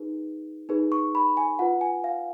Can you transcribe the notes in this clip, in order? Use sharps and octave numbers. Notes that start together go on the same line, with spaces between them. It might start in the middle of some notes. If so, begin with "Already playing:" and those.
Already playing: D#4 G#4 B4
D#4 G#4 B4
C#6
B5
G#5
F4 B4 F#5
G#5
F5